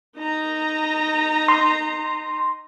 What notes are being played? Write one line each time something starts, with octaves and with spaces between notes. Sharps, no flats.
D#4 A#5
C6